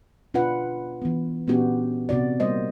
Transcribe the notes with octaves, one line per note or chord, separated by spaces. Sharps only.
B2 D4 F4 B4 F#5
E3 B3
A#2 B3 C#4 D4 F#4 G4
C3 B3 F#4 D5
G3 A#3 C5 D#5